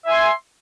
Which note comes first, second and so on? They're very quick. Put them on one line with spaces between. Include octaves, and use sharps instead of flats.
E5 G#5 C6